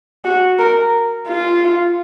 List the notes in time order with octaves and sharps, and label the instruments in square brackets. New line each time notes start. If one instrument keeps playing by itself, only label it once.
[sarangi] F#4
A#4
F4